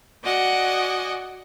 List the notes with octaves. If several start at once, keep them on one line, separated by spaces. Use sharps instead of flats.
F#4 D5 D#5 F#5 G#5